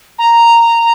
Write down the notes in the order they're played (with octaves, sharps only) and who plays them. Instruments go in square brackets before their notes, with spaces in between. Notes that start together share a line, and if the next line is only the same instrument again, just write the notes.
[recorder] A#5